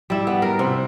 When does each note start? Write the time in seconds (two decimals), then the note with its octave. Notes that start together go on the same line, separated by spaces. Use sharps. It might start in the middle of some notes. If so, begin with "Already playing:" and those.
0.10 G3 E4
0.27 B3
0.42 A#4
0.59 C3